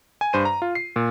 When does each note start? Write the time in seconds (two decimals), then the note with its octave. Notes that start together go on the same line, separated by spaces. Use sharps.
0.21 G#5
0.33 G2 C5 D#7
0.45 A#5
0.62 F4
0.75 C7
0.96 A#2